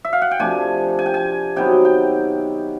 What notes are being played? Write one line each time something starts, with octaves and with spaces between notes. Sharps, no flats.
E5
F5
F#5
G5
C3 F3 A3 D4 G#5
G#5
G5
G#5
C3 D#3 F#3 B3 G5
G5